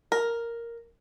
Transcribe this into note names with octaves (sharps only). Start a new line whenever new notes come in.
A#4